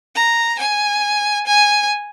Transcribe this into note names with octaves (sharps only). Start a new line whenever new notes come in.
A#5
G#5
G#5